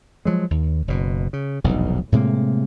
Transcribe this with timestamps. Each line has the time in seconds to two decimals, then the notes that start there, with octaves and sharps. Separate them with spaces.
0.25 F3 F#3 G#3
0.51 D#2
0.88 F#1 B2
1.33 C#3
1.64 F1 B1 E2 G2
2.12 A2 C3 G#3 A#3